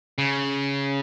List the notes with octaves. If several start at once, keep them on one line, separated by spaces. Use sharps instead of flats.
C#3